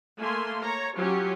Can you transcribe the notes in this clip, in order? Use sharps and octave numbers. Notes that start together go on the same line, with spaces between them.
A3 A#3 G#5 C6
C#5 A#5
F#3 C#4 F4 G4